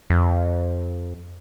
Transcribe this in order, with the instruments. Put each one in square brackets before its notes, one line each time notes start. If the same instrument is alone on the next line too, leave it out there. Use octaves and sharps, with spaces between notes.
[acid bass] F2